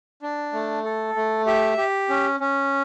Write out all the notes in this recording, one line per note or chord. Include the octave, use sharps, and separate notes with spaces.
D4
A3
A4
A3
G4 E5
G4
C#4
C#4